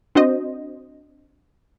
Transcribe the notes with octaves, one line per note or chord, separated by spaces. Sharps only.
C4 D4 F#4 C5 D#5